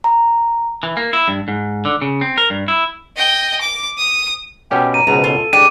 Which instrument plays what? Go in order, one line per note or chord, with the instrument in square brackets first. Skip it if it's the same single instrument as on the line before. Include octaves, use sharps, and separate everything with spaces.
[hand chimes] A#5
[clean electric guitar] E3
A#3
E4
G2
G#2
D3
C#3
C4
A#4
G2
E4
[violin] D#5 G5
D6
D#6
[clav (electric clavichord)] B2 C#4 G4 [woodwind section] G5
[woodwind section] A#5 [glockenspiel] D#7
[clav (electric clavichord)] C#2 B2 [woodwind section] G#2 [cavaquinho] A#5
[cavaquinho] F4 [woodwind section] A4
[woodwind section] A2 G#3 [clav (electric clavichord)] D4 [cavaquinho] G4 [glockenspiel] D#7